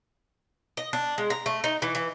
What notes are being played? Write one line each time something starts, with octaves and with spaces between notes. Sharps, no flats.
D#5
D4
G#3
A#5
A3
D#4
E3
E3